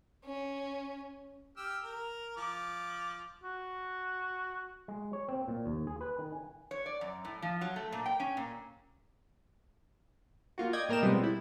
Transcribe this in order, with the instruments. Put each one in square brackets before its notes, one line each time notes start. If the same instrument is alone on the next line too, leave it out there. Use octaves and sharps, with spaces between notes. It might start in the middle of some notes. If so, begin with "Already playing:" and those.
[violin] C#4
[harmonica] G4 E6 F6
A#4
F3 D6
[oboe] F#4
[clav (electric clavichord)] G#3
C#5
C4
A#2
D#2
G#4
B4
D#3
G#5
[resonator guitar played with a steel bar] C#5
D5
F#2
A2
F3
F#3
A3
A#2
G5
C#4
A#2
[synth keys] A#3 F4 F#4
D5 D#5 G5 G#6
A2 A#3 A#4 D#5 G5 E7
B2 F3 G3 G#3 B3 C4
E4